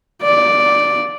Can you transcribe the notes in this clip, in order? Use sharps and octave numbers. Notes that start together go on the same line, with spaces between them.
D5